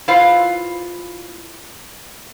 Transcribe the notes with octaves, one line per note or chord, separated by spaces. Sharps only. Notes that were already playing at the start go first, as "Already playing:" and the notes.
E4 F4 B4 C5 F5